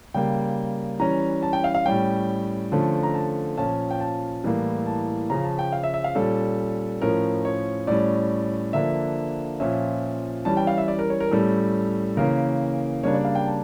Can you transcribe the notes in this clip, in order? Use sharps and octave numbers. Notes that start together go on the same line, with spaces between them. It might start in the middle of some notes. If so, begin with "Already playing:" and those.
C#3 G3 A#3 G5
E3 G3 C#4 A#5
A5
G5
F5
F5
A2 G3 C#4 G5
D3 F3 A3 C#4
A#5
A5
A#2 F3 C#4 A5
G5
A5
A2 E3 G3 A#3
A5
C#3 F3 C#4 A#5
A5
G5
F5
E5
E5
F5
A#2 G3 C#4 A4
A2 F3 C#4 A#4
C#5
A2 G3 C#4 D5
D3 F3 A#3 D4 E5
A#2 F3 C#4 E5
E3 G3 C#4 A5
G5
F5
E5
D5
A#4
C#5
A#4
A2 G3 C#4 A4
C#3 E3 A#3 C#4 A#4
C#3 G3 A#3 D4 C#5
D5
F5
G5
A5